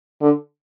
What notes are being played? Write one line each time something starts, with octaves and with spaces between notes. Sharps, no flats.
D3